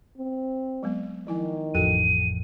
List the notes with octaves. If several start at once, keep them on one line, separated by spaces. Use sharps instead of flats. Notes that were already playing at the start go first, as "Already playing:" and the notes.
C4
F#3 G#3 B3
D#3 F3 E4 G#5
A1 F2 F#4 A4 G5 D#7